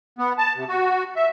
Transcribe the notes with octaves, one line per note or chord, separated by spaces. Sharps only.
B3
A5
C3
F#4
E5